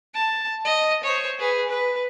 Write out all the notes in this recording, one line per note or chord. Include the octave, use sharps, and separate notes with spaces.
A5
D#5
C5 C#5
G#4 B4
B4